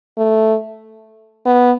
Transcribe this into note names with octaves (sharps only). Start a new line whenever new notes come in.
A3
B3